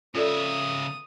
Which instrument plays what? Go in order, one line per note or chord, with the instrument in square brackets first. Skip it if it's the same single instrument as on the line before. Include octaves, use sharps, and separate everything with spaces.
[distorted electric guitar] C#3 E5 [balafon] F4 A4 D5 [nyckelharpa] D#6